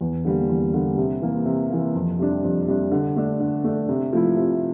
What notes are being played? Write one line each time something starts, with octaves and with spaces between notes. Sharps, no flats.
E2
D3 G3 A#3
E2
D3 G3 A#3
C3
E3 A#3
C3
E3 A#3
F2
C3 G3 D4
F2
C3 G3 D4
D3
A3 D4
D3
A3 D4
C3
F3 A3 E4
C3